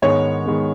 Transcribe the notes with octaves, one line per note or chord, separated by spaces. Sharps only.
G#2 D#3 G#3 B3 C#5
D#3 G#3 B3